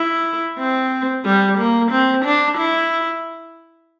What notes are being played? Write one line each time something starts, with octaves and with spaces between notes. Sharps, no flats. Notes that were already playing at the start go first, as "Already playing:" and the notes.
Already playing: E4
C4
G3
A#3
C4
D4
E4